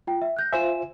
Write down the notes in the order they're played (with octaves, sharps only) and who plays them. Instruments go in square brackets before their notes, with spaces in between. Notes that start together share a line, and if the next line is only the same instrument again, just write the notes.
[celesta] F4 G5
E5
F#6 G6 A#6
[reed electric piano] F4 C5 E5 [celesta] G#5 E7